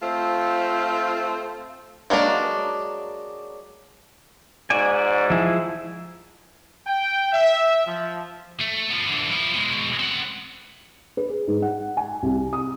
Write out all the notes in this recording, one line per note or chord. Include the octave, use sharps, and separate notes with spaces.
A3 C4 F4 C5
F#3 G#3 A#3 D4
G#2 F#4 D5 G#5
F3 E4 G#4
G5
E5
F3
A3
F3 B3
D3 E3
F3 E4
B2 G#3
C4 F#5
B4
G#4
G#2
F#5
G#5
C2
D#6